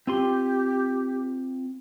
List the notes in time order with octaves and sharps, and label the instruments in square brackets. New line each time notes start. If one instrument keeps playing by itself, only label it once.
[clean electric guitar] C4 F4 C6 [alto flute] G4